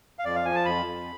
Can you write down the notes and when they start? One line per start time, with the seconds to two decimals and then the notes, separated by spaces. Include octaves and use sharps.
0.19 F5
0.24 F2 D5
0.35 F5
0.45 F3 G#5
0.55 A5
0.65 F2 B5
0.86 F2